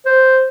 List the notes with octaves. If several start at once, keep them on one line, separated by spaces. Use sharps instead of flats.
C5